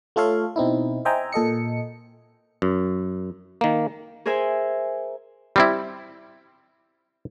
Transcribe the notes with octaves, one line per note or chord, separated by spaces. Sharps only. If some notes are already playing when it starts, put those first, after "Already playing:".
A3 F4 A4 C#5 F5
B2 C4 D#4 E4
C5 D#5 E5 G5 G#5 A#5
A#2 A4 D#5 C#7
F#2
D#3 A#3
G#4 A#4 C5 E5 G#5
G3 C4 E4